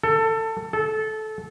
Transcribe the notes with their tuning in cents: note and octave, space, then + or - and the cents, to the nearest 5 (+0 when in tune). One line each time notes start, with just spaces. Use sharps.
A4 +20
A4 -20